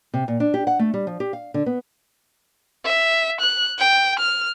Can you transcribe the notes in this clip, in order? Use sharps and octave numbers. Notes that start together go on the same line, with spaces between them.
C3
A#2
D4
G4
F#5
A3
G3
F3
G4
F5
D3
B3
E5
F#6
G5
F6